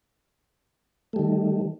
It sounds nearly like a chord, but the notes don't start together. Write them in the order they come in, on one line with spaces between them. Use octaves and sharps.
A3 G3 D#3